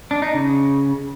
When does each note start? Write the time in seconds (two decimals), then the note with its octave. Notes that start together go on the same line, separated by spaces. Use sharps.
0.11 D4
0.22 D#4
0.33 C#3